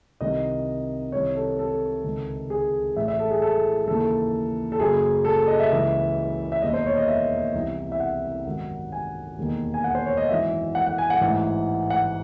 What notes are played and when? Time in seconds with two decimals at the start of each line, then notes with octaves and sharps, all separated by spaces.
0.21 C2 C3 D#3 D#5
1.12 C2 C3 D#3 C#5
1.35 A4
1.59 A4
2.04 C#2 C3 D#3
2.50 G#4
2.96 A1 A2 E3 E5
3.08 E5
3.19 A4
3.30 G#4
3.42 A4
3.87 D#2 C#3 E3 A4
4.72 A4
4.79 F#1 F#2 C#3 G#4
5.25 A4
5.48 D#5
5.60 E5
5.71 C#2 C#3 E3
6.52 E5
6.62 E1 D#2 D#3 D#5
6.74 C5
6.86 C#5
6.97 D#5
7.08 E5
7.55 C2 C3 E3
7.92 E5
8.00 F#5
8.47 G#1 F#2 D#3
8.92 G#5
9.38 E1 D#2 D#3
9.74 G#5
9.84 F#5
9.95 C5
10.06 C#5
10.17 D#5
10.29 G#1 F#2 E3 E5
10.75 F#5
10.86 F#5
10.98 G#5
11.10 F#5
11.21 A1 G#2 E3 F#5
11.90 F#5